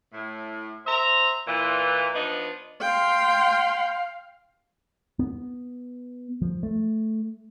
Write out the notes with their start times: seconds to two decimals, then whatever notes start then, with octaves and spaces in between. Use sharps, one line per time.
0.12 A2
0.86 C5 E5 A#5
1.47 A#2 E3
2.14 F3 B3 D4 D#4
2.81 F5 G5 C6
5.19 B3
6.42 F3
6.63 A3